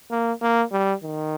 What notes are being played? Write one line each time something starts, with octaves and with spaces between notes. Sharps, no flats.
A#3
A#3
G3
D#3